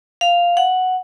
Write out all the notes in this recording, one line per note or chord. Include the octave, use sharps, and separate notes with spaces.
F5
F#5